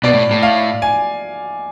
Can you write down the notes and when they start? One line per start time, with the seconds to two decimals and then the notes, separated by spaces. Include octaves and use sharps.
0.03 B2 D5
0.13 A2
0.31 A2
0.42 F5
0.82 G#5